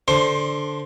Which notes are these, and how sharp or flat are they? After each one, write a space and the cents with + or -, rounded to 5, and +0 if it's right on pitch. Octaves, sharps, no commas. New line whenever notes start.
D3 +0 C5 +0 C6 +25